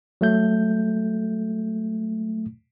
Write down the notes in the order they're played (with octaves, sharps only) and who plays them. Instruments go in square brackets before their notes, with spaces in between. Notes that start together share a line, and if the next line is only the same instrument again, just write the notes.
[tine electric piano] F#3 A3 G6